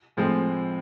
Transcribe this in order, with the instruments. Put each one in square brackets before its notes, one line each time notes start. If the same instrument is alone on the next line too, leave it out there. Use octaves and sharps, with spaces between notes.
[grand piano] A2 F3 G#3 C4